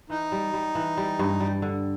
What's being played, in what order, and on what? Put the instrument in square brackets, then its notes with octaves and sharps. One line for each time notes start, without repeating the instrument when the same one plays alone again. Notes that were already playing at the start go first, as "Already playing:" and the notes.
[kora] E3 [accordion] D#4
[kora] G3
G3
E3
G3
G2
G3
D3